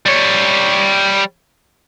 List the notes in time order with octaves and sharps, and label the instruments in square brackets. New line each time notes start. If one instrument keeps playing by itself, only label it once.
[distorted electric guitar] G3 C#5